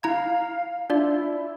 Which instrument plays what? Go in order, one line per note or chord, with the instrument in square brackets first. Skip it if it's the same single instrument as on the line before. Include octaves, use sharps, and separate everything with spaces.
[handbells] E4 A#5 G#6 [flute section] F5
[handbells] D4 F4 D5 [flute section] E4